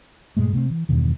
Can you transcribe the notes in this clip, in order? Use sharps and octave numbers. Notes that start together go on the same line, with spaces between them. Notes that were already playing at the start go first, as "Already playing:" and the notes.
G2 A#2 G#3 A3
C3 A3 B3 C4
E3
E2 G2 B2 D#3